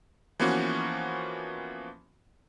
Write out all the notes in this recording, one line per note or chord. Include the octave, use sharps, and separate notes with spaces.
E3 F3 A#3 B3 C#4 F#4